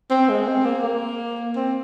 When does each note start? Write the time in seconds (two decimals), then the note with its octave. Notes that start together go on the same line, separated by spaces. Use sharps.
0.11 C4
0.29 G#3
0.47 C4
0.66 A#3
0.84 A#3
1.56 C4